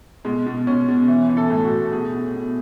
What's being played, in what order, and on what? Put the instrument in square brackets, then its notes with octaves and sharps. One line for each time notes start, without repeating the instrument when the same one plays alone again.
[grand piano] B2 G#3
B2
B2 C#4
B2
E3
E3
A4
A2
F#4
A2
B2 G#4
B2
B2